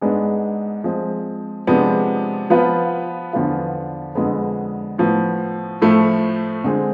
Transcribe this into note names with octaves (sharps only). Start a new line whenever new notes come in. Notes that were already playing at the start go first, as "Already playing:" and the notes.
G#2 G#3 B3 D4 G#4
F3 G#3 C4
C3 F3 G#3 B3 D4
F3 B3 F4 B4
E2 D3 F3 B3 F4
F2 D3 G#3 B3
A2 F3 B3
A2 F3 A3 E4
D3 G#3 C4 G#4